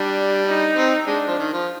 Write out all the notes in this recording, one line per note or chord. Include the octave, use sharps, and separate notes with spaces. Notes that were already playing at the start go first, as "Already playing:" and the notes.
Already playing: G3 D4
D#4
C4
G#3 D4
F3
D#3
F3